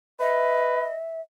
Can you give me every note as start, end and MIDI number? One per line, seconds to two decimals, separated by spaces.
0.20 0.87 71
0.20 0.94 75
0.20 1.21 76